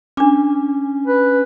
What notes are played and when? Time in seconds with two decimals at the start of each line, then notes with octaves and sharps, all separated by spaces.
0.17 C#4 D4 D6
1.07 B4